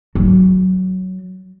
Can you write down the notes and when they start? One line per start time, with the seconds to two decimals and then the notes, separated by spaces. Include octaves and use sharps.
0.15 F#3